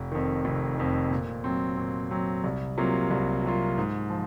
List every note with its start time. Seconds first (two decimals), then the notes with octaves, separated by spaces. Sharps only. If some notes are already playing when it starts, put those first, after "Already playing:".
Already playing: F1
0.12 F2 D#3
0.45 F1
0.77 F2 D#3
1.11 A#2
1.44 F#3 C4
1.77 A#2
2.11 F#3 C4
2.44 C2
2.78 C3 F#3 A#3 F4
3.11 C2
3.44 C3 F#3 A#3 F4
3.78 G#2
4.10 F3